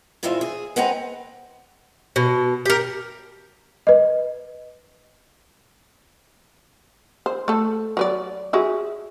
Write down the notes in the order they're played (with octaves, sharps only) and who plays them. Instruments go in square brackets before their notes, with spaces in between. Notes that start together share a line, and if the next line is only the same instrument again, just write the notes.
[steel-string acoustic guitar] A#2 E3 G#3 C4 F4 E5
G#4
G#3 C4 B4 F#5 G#5 A#5
[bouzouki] B2
G4 A#4
[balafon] B4 D#5
[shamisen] C5
A3 A4
F#3 B4 D5
F#4 G#4 E5